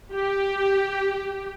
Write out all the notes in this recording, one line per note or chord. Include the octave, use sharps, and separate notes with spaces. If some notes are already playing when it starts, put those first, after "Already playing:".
G4